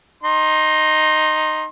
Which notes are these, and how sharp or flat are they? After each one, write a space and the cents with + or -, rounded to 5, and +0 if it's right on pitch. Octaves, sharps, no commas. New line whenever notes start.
D#4 +0 C6 +25